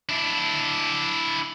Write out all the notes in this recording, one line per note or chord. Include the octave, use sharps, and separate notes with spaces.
D4 E4